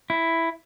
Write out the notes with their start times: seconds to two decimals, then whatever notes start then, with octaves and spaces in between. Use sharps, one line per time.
0.10 E4